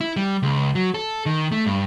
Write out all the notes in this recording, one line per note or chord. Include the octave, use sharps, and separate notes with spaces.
E4
G3
C#2
F#3
A4
D#3
A3
G2